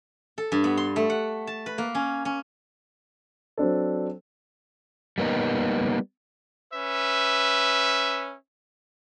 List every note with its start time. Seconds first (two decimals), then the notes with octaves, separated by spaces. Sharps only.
0.38 A4
0.52 G2
0.64 B3
0.77 C6
0.96 A3
1.10 F#5
1.47 A5
1.66 B4
1.78 A#3
1.95 C#4
2.25 C#4
3.57 F#3 C4 D4 A4
5.18 G3 A#3 B3 D#4
6.74 C#4 B4 E5